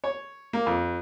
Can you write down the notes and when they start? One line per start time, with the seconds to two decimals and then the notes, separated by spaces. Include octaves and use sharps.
0.04 C#5
0.53 A#3
0.67 F2